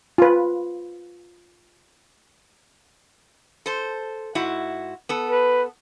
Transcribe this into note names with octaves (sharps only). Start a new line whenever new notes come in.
F4 B4
A4 C5
G#2 E4 F#4
B3 A4
B4